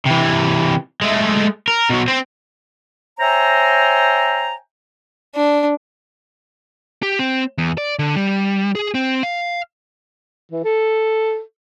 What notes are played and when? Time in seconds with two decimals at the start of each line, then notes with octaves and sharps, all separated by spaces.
0.06 C3 E3
1.01 G#3 A3
1.68 A#4
1.89 B2 F#3
2.08 C4 C5
3.20 C5 C#5 E5 G5 G#5 A#5
5.35 D4
7.03 G4
7.19 C4
7.58 E2
7.78 D5
7.99 D3
8.16 G3
8.75 G#4
8.94 C4
9.23 F5
10.51 E3
10.64 A4